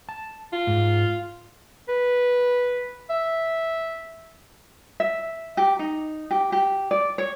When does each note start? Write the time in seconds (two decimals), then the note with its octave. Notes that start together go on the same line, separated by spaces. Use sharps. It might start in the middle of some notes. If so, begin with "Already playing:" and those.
0.09 A5
0.53 F4
0.67 G#2
1.88 B4
3.10 E5
5.00 E5
5.57 G4
5.79 D#4
6.31 G4
6.52 G4
6.91 D5
7.18 C#5